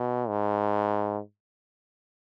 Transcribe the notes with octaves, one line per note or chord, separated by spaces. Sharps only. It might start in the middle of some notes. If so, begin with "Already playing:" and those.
Already playing: B2
G#2